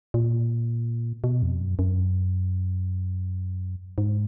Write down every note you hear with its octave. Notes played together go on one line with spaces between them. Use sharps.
A#2
B2
F2
F#2
F#2
G#2